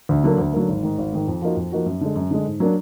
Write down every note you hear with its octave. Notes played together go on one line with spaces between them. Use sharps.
D2
D3 F#3 A#3
D2
D3 F#3 A#3
G#1
G#2 D#3
G#1
G#2 D#3
F2
F3 A#3 D#4 F#4
F2
F3 A#3 D#4 F#4
F#2
D3 G#3
F#2
D3 G#3
G#2
F#3 A#3 D4